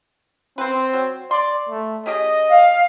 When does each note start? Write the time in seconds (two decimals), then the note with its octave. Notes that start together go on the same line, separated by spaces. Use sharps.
0.58 C4 B4 C5
0.93 F#3
1.31 D5 C6
1.69 A3
2.06 C#4 G4 G#4 D#5
2.49 F5